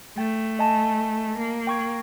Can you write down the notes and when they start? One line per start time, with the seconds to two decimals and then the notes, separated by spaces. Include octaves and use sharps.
0.18 A3 G5
0.59 D#5 G#5 A5
1.38 A#3
1.67 G5 C#6 G#6